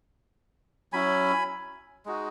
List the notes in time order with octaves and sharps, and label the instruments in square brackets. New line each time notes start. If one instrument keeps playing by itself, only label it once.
[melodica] F#3 C#4 E4 G#5 B5
G#3 D#4 F#4